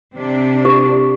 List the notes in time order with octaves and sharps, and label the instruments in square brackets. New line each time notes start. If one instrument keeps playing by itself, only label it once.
[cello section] C3 D4
[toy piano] G4